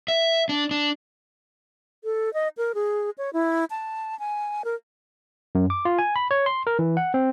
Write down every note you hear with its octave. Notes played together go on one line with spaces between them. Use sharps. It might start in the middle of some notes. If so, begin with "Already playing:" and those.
E5
D4
D4
A4
D#5
A#4
G#4
C#5
E4
A5
G#5
A#4
F#2
D6
F4
G#5
B5
C#5
C6
A#4
E3
F#5
C4